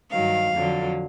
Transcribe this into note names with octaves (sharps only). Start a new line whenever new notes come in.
G2 D#3 F#3 F5
F2 D3 F#3